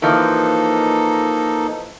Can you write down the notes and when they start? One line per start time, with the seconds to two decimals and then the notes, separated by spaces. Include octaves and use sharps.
0.02 E3 F3 A#3 D#4 A4